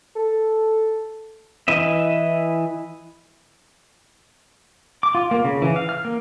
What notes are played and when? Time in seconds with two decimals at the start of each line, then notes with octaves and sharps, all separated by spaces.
0.16 A4
1.68 E3 E4 B4 D#5 E5
5.03 D6
5.15 F4
5.31 A#3
5.45 C#3
5.62 E3
5.76 F5
5.89 F6
6.05 A#3